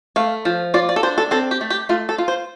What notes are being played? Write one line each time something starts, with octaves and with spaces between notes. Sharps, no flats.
A3 F5
F3
F4 D5
D5
A4
D4 C5
A4
C4 A4
G4
A3
G4
A3 F4
A4
F4
C5